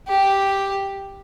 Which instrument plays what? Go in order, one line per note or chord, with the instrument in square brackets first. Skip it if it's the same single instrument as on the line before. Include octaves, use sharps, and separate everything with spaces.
[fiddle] G4